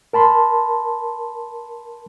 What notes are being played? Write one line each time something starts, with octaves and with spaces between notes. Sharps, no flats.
A#4 A5 B5 C6